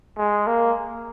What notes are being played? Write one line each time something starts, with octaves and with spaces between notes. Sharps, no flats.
G#3
A#3